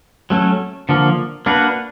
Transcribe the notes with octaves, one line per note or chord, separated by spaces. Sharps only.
F#3 A3 C#4
D3 F3 A#3
A#3 D4 F#4 B4